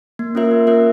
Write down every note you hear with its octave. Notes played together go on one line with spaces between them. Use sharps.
A#3
C#4 F4 A#4 E5
A#3
C#4 F4 A#4 E5